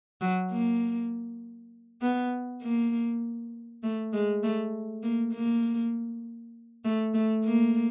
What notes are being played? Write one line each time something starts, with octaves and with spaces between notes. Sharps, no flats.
F#3
A#3
B3
A#3
A3
G#3
A3
A#3
A#3
A3
A3
A#3